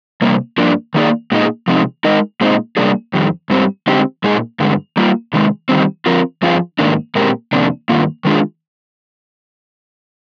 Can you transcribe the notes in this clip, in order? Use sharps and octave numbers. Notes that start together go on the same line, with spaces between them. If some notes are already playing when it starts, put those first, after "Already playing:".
C3 G3 A#3
G2 F3 A#3 D4
D#3 A#3 D#4 G#4 D5
A#2 G#3 D#4 G#4
C3 F3 G#3 C4 D#4
G#3 D#4 A#4 D#5
A#2 G#3 C4 D#4
C3 G3 A#3 D4 G#4
F2 D#3 G3
G#2 G3 C4
D3 G#3 C4 D#4 G4
A#2 G#3 D#4 G#4
G2 D3 G#3
G3 A#3 F4
C3 D#3 G#3
D#3 G3 C4
F3 C4 F4 A#4
G2 F3 C4 F4 G#4
G#2 D#3 A#3 D4
A#2 G#3 C4 G4 A#4
F2 C3 D#3 A#3 D4
G2 D#3 A#3 F4
D#3 G#3 D4 F4 G#4